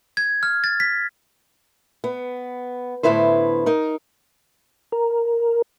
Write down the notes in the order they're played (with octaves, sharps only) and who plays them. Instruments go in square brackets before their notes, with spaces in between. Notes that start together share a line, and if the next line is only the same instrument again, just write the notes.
[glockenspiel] G#6
F6
A6
B6
[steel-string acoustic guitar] B3
A2 D3 B3 E4 B4 C5
D#4 A#4
[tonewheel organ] A#4